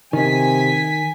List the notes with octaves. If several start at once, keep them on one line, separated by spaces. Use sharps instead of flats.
C3 D#3 G#5 B6